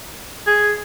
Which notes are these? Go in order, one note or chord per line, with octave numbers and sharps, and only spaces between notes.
G#4